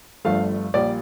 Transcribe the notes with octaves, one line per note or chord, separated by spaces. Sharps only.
G1 G2 F3 A3 F5
A#1 A#2 G3 D5